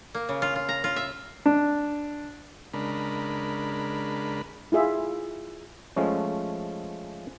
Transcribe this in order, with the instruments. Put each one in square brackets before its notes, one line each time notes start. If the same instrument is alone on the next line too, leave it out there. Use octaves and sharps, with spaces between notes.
[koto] A#3
C#3
F4
F4
A#5
F4
E5
[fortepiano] D4
[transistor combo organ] C#3 G#3 D4 A#4 B5
[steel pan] E4 F4 G#4 E5
[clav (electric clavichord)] F3 G#3 A3 C#4